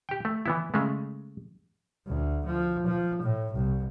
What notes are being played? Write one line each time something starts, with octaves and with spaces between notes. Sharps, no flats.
G4 G5
A3
E3 B3 E4
C#3 G#3 A3
D2
F3
F3
A2
C2